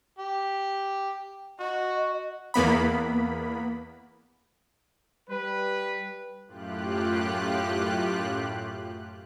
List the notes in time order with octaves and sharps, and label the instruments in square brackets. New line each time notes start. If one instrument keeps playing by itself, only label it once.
[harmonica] G4
[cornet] F#4 [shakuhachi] D#5
[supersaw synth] E2 A#3 B3 B5
[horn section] G3 B4
[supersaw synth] F#2 A2 F4 G4 F#6